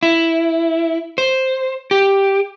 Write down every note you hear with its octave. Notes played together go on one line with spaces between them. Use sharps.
E4
C5
G4